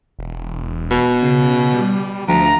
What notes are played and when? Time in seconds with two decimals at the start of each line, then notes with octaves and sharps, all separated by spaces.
0.19 E1
0.91 B2
1.22 C#3
1.73 G3
2.28 D2 F3 A#5